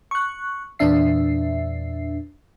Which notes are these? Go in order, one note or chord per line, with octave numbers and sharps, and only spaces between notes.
C#6 F#6
E2 A#2 D4 E5 C7